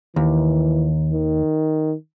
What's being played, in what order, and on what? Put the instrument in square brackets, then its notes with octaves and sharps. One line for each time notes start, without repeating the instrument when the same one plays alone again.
[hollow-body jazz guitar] D#2 [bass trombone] E3
[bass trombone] D#3